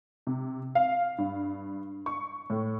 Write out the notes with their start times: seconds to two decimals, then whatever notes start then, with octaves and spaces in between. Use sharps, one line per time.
0.27 C3
0.75 F5
1.18 G2
2.06 C#6
2.50 A2